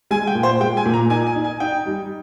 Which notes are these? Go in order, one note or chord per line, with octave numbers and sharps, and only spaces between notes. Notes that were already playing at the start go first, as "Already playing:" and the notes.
G#3 G#5
G5
A#2
C5
G#3 G5
G#5
A#2
A#5
D#4 G#5
G#5
D#4
G#5
D#4 G5
G3